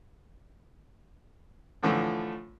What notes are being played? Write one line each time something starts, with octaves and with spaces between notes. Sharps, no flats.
A2 D3 E3 F3 A3